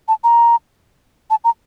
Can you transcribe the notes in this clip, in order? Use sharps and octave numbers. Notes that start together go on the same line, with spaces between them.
A5
A#5
A5
A#5